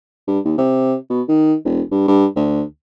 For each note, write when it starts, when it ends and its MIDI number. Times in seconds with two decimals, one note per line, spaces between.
0.27 0.39 43
0.45 0.54 39
0.58 0.95 48
1.10 1.22 47
1.28 1.55 51
1.65 1.81 28
1.91 2.06 43
2.08 2.26 43
2.36 2.63 38